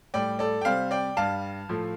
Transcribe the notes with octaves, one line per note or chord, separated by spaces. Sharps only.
A2 G3 D5 G5
A4 D5
G5
C3 G3 C5 F5
D5 G5
G2 G3 F5 A5
A2 F3 A3